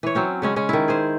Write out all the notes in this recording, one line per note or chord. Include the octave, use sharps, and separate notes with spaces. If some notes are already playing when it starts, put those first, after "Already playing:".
E3 C#5
F#3 C4 C#4
C#3 G#3 C#4
G#3 C#4
D#3 E4
G#4 C5